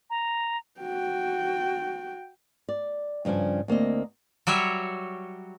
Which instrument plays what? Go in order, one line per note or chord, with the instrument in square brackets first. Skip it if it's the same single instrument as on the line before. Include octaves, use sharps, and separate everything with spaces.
[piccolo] A#5
[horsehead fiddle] F#4 G5
[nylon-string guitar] D5
G2 C#3 F3 D4 G#5
D2 A#3 C4 D#5
[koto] F#3 G3 F#4 C#5 E5